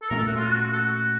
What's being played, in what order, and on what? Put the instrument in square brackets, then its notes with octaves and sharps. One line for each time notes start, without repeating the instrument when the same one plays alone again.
[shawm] A4
[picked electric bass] A#2 A3 C#4 [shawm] A#4
[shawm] A4
F#4
F4
F#4
A4
F#4